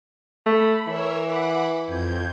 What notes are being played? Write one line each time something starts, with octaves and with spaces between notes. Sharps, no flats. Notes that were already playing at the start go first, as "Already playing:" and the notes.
A3 B5
E3 A#4 C#5 E6
F#5 B5 D6
F2 G6 G#6